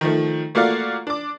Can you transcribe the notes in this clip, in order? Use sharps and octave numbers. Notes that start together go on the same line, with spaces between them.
D#3 F3 A3
A3 A#3 F4 F#4 D5 F5
D4 D6